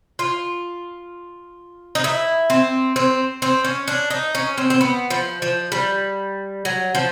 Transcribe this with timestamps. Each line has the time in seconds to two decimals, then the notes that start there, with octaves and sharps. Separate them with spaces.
0.19 F4
1.95 D#4
2.04 E4
2.50 C4
2.96 C4
3.42 C4
3.65 C#4
3.88 D4
4.10 D#4
4.35 C#4
4.58 C4
4.70 C4
4.81 B3
5.10 F3
5.42 F3
5.72 G3
6.65 F#3
6.95 F3